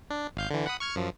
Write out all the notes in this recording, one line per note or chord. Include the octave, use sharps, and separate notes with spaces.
D4
G#1 F5 G6
D3 E3
F#5 B5 D#6
C#6 F6 G#6
F#2 F3